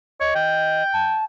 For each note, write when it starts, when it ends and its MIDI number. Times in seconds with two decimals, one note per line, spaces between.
0.20 0.30 73
0.20 0.83 75
0.35 1.23 79
0.93 1.24 81